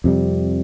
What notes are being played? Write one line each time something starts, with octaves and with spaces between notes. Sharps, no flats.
F2 C3 G3